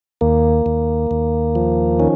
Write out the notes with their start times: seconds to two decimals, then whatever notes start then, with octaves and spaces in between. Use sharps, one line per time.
0.21 D#2 A#3
0.66 D#2
1.11 D#2
1.55 F3
1.99 D#3 C#4